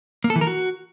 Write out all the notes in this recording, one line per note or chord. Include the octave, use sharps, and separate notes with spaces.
A#3
A4
E3
A#4
F#4